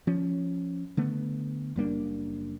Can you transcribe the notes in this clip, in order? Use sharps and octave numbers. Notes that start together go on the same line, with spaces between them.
F3 C#4
D3 A3 B3
F#1 G3 A#3 D4